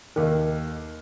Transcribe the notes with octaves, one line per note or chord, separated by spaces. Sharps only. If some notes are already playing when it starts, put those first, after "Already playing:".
D#2 D#3